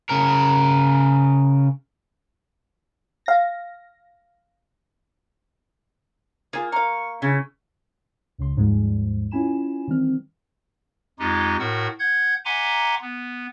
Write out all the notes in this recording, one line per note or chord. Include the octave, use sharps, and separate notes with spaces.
C#3 A#4
F5 A#6
A#3 F4 G#4
A#4 F5 C#6
C#3 E4
C#2 C#3 C6
D#2 G#2 F3 G3 G#3
C#4 E4 F4 G#5 B5 E7
D#3 E3 G3 C4 F6
F2 G#3 D#4 F4 G4
A2 F#4 A#4 F#5 E6
F#5 G6 G#6
E5 F#5 G#5 A#5 C6 D6
B3